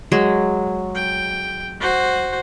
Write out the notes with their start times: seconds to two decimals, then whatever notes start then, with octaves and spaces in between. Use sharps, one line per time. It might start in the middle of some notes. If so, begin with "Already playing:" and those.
0.12 F#3 G#3
0.95 G5
1.81 F#4 C5